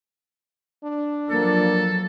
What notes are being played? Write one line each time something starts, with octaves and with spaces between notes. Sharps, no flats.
D4
F3 F#3 A#3 A4